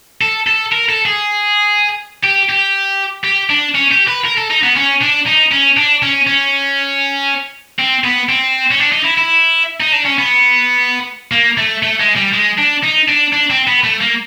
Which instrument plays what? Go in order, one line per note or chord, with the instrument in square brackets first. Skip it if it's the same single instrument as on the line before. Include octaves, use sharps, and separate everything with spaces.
[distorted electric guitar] A4
A4
A#4
A4
G#4
G4
G4
G4
D4
C#4
G4
B4
A#4
A4
D#4
B3
C#4
D4
D#4
C#4
D4
C#4
C#4
C4
B3
C4
C#4
D4
D#4
E4
E4
D#4
D4
C#4
B3
A#3
A3
A3
G#3
G3
G#3
D4
D#4
D4
D4
C4
B3
A3
A#3